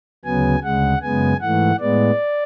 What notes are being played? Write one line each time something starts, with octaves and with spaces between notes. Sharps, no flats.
D2 C#3 F#3 B3 G#5
D2 C#3 G#3 F#5
F#2 C#3 G#3 B3 G#5
G#2 E3 A3 F#5
A2 G#3 B3 D5